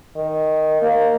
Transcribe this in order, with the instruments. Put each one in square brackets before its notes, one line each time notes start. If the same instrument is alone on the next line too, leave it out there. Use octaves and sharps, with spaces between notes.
[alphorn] D#3
A#3